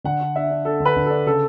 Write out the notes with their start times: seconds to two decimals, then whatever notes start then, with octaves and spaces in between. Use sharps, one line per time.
0.04 D3 F#5
0.21 D4
0.35 D4 E5
0.51 D4
0.65 D4 A4
0.80 D3
0.85 B4
0.96 D3
1.06 D4 A4
1.26 C#3 A4